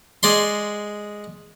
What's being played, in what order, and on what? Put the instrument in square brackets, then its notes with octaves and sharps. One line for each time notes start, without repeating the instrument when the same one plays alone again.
[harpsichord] G#3 D5 C6